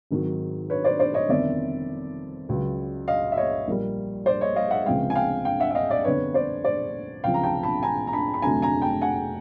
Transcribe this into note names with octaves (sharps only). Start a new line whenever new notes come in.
G#1 G#2 D#3 F#3
B4 C#5
C5 D5
C5 D5
C#5 D#5
G1 F2 C3 D#3 D5 E5
C#2 C#3 F#3
D#5 F5
E5
C#5 D#5
A#1 A#2 G3 A#3
C5 D5
C#5 D#5
D#5 F5
E5 F#5
C#2 C3 F3 G#3 F5 G5
G#5
F5 G5
F5 G5
E5 F#5
E5
D#5 F5
D5 E5
G1 F2 D3 B4 C#5
C5 D5
C5 D5
C#2 C3 F3 F5 G5
A#5
G5 A5
A5 B5
G#5 A#5
A#5
A5 B5
B5
F1 F2 D3 F#3 A3 G#5 A#5
G#5 A#5
G5 A5
F#5 G#5